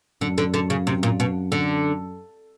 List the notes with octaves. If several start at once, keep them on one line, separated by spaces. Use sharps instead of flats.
F#2 D3
D3
D3
C#3
C3
A#2
B2
D3